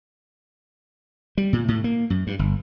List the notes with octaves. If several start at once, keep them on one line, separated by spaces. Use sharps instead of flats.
G3
A#2
A2
A#3
F#2
G2
G1